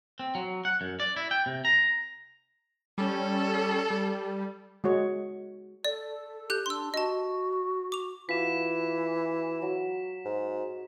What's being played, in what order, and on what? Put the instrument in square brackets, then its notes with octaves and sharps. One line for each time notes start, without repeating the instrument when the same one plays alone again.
[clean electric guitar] C4
F#3
F#5
F#2
D5
E4
G5
C3
A#5
[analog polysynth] G3 C#4 [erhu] A4
[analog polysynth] G3
[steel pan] G#3 F#4 C#5
[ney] A4 [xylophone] D5
[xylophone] G4 F#6 G6
[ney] D4 [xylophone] C6 E6
[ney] F#4 [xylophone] D#5 A5
[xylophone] D6 F7
[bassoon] E3 [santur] F4 F#4 C6 [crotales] B6 E7
[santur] F#3
[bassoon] G#2